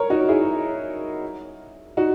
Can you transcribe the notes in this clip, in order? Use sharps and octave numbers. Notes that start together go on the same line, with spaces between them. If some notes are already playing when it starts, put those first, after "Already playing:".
Already playing: A#4 C#5
D#4 F#4
E4 G#4
D#4 F#4